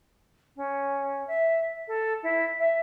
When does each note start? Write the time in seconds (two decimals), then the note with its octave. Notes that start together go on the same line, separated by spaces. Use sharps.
0.56 C#4
1.27 E5
1.87 A4
2.22 E4
2.59 E5